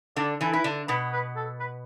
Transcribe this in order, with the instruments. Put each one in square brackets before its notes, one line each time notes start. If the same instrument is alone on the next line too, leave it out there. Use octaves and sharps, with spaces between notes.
[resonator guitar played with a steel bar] D3 D4 [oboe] D5
[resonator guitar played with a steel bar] E3 E4 [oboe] A4
[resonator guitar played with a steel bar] E4 [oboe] B4
[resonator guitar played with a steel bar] D3 D4
[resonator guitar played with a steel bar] B2 B3 [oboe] B4
[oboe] B4
A4
B4